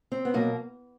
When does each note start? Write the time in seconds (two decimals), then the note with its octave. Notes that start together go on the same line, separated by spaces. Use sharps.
0.12 C4
0.25 B3
0.34 B2 F#3 A#3